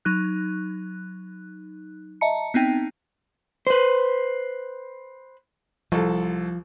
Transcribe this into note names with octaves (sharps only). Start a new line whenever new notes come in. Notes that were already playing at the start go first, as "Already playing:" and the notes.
F#3 D#4 F#6
D#5 E5 A5 A#5 C#7
B3 C4 D#4 G5
B4 C5
C2 F3 A4